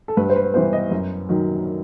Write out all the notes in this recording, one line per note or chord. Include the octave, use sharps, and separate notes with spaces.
A4
G2 B4
C5
B4
E3 G3 B3 C5
D#5
F#2
D#3 F#3